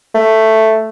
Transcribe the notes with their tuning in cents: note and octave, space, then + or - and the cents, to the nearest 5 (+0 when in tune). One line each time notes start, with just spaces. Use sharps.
A3 +5